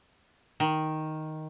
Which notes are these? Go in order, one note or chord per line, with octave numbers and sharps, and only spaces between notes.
D#3